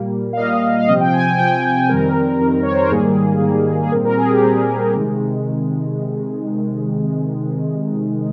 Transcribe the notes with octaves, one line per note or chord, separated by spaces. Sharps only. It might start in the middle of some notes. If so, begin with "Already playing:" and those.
Already playing: A#2 G3 A#3
F5
A#2 G3 A#3 D#5
F5
C3 F3 C4 D#5
G5
G#5
G5
C3 F3 C4 G5
F2 D#3 G3 C4 A#4
F2 D#3 G3 C4
C#5
C5
A#4
G#2 D#3 G3 A#3 G#4
G#2 D#3 G3 A#3
G#4
A#2 G3 C4 A#4
A#4
G#4
G4
A#2 G3 C4
C3 D#3 G#3